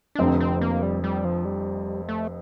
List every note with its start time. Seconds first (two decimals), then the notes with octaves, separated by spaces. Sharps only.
0.15 D4
0.19 F1 F2 D3 C4
0.40 C4
0.61 A#3
0.82 G3
1.04 G3
1.24 F3
1.45 G3
2.09 A3